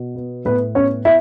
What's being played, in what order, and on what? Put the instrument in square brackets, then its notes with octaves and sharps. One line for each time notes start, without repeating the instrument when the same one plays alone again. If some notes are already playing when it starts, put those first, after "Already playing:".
Already playing: [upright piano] B2
B3
A2 B3 B4
B3 C#4 C#5
E4 E5